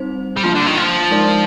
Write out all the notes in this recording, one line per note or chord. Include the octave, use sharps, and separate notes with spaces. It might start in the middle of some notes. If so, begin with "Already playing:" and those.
Already playing: G3 C4 D#4 C5
G3
F3 A#3 D4 F4
D3
D#3
F3
G#3 D#4 A#4 D5